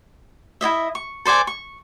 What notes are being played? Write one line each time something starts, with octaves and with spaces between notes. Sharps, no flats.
E4 F4 D#5 E5
C#6
A4 C5 D5 G#5
C#6